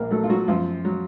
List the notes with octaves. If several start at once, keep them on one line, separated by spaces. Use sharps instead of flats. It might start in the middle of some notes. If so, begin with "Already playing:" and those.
Already playing: A#1 A#3 A#4
F#3 A3 A4
F4
F#3 F#4
F#2 F3 F4
F#3